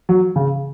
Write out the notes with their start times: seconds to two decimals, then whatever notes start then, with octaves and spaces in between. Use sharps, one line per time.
0.09 F#3
0.36 C#3